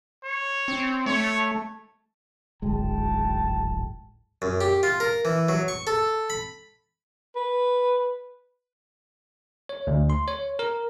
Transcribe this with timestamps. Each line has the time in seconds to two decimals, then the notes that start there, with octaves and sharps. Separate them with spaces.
0.24 C#5
0.68 C4
1.06 A3 C#5
2.62 D1 G#1 G#3 G5 A5
4.42 F#2
4.61 G4
4.83 F4
5.00 A#4
5.25 E3
5.49 F#3
5.68 C#6
5.87 A4
6.30 B5
7.36 B4
9.69 C#5
9.87 D2
10.10 C6
10.28 C#5
10.59 A#4